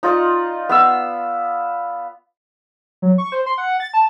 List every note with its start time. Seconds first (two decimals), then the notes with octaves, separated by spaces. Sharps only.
0.03 D#4 F4 D5 D#5
0.69 B3 F5 E6
3.02 F#3
3.18 C#6
3.32 C5
3.46 C6
3.58 F#5
3.80 A6
3.94 A5